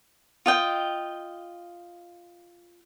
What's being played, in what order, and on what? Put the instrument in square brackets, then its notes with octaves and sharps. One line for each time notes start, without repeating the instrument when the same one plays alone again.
[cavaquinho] F4 D#5 G5